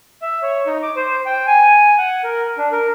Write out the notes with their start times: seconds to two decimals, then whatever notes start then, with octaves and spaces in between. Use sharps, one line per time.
0.22 E5
0.43 C#5
0.66 D#4
0.83 D6
0.96 C5
1.26 G5
1.47 G#5
1.98 F#5
2.24 A#4
2.58 D4
2.72 A#4